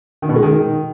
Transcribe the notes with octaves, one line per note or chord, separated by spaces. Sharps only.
D#3
B2
G#3
D#3